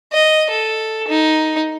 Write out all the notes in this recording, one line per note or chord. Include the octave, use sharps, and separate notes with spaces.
D#5
A4
D#4